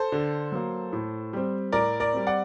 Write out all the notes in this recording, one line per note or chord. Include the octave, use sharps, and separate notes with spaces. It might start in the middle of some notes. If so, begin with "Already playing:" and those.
Already playing: A4 C5
D3
F#3 A#3
A2
G3 C4
A2 A#4 D5
A#4 D5
G3 C4
D5 F#5